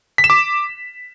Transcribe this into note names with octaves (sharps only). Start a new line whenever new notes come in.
B6
E7
D6